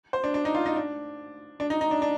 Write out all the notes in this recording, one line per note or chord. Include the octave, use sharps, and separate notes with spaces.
C5
D4
D4
D#4
F4
D#4
D4
D4
D#4
D#4
D4
D4